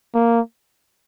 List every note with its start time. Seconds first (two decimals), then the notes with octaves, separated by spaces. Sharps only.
0.14 A#3